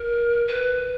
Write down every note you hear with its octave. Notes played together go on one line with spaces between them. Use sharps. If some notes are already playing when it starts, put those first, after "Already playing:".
Already playing: A#4
B4